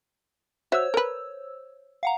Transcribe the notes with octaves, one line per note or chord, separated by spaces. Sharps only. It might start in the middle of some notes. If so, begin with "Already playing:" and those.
F#4 C5 C#5 E5 E6
A#4 B4
F5 F#5 A#5